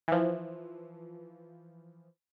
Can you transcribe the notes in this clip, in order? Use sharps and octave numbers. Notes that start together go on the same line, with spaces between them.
E3 F3